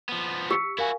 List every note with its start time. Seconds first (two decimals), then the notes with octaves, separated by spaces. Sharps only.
0.09 F3 B3
0.51 G4 E6 B6 C#7
0.78 E4 F#4 A#4 F5 G#5